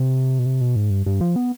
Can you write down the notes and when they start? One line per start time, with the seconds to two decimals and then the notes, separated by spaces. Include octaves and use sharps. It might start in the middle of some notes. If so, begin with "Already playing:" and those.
Already playing: C3
0.39 B2
0.46 C3
0.61 B2
0.76 G#2
0.90 G2
1.06 G2
1.21 F3
1.36 B3